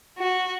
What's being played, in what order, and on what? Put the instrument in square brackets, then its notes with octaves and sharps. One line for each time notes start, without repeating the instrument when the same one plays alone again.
[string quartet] F#4